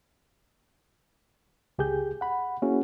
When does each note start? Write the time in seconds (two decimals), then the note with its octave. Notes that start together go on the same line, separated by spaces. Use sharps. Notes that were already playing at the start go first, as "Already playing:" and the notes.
1.79 C#2 G4 G#4 G6
2.21 F#5 B5
2.62 A#3 C#4 E4 F#4 G#4